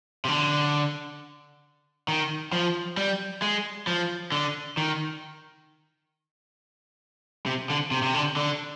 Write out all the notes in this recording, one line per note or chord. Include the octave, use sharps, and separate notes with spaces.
C3
D3
D#3
F3
G3
G#3
F3
D3
D#3
C3
D3
C3
C3
D3
D3